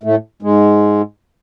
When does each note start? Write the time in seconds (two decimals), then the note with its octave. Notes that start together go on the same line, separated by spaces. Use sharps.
0.03 A2 A3
0.42 G#2 G#3